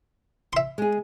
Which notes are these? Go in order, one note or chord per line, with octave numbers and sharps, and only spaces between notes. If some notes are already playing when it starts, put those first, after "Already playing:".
E5 C6
G#3 G#4